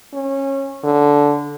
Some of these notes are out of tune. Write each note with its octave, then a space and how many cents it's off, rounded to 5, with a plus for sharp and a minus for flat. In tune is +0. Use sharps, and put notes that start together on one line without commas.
C#4 -25
D3 -10